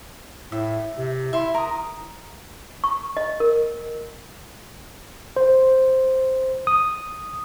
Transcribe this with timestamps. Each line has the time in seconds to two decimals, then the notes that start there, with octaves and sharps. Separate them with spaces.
0.52 A2 E5
0.98 C3
1.33 E4 E5 C6
1.54 A#4 D#6
2.84 C#6
3.17 D#5
3.40 A#4
5.37 C5
6.67 D#6